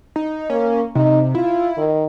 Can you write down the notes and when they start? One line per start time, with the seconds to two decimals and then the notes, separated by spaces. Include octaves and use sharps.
0.16 D#4
0.50 A#3 C#4
0.95 C3 D#4
1.35 E4 F4
1.78 D#3